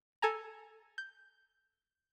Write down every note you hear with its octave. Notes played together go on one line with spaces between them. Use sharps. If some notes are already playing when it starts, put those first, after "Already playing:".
A4 G#5 A#5
G6